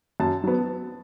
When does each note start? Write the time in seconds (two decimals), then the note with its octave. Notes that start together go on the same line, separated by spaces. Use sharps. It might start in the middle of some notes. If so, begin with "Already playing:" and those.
0.20 F#2 A5
0.44 F#3 B3